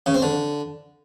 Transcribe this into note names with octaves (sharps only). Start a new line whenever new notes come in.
C#3
C4
D3